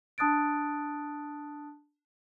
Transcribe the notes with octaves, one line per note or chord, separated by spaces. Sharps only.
D4 A5 D#6 F#6 A6 D7